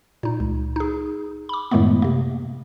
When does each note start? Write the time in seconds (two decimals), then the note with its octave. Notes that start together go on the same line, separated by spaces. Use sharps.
0.23 A#2 D#4
0.40 C#2
0.76 D#4 G#4
1.49 B5 D6
1.71 F#2 A2 D#3 G#3 A3 B3
2.02 C3 A#3